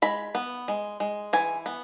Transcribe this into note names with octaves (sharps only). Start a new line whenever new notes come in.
G#3 B5
B3
G#3
G#3
E3 G#5
B3